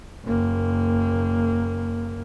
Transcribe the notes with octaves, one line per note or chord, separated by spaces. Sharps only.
F#1 A#3